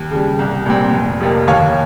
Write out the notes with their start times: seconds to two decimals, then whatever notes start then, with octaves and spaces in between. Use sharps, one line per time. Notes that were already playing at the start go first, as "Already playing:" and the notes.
Already playing: D#2
0.11 C#3 G3
0.39 C2
0.66 A#2 G3 C4
0.93 F1
1.20 F2 C3 F3 A#3
1.48 D#2 C#5 F5